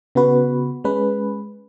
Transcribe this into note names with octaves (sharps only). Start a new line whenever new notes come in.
C#3 B3 F#4 B4
G#3 C#4 B4